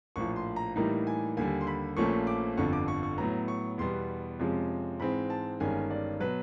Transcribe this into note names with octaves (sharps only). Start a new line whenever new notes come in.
A#1 A2 F3 C#6
C6
A#5
A2 E3 G3 A#3 D#4 A#5
G#5
D#2 D3 G3 G#5
C6
B5
A#1 A#2 F3 A3 C#4 C#6
D6
G1 F2 D3 F3 C#6
D6
C#6
C#6
A2 F#3 B3 A#5
C#6
E2 B2 G3 B3 C6
F2 C3 F3 G#3 C#4
G#2 E3 G#3 C4 B5
A5
G1 G2 D#3 G#3 C#4 G#5
D5
B2 F#3 B4